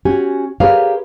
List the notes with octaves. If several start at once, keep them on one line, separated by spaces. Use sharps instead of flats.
C#4 F#4 G4 G#5
G4 G#4 A#4 B4 C#5 F5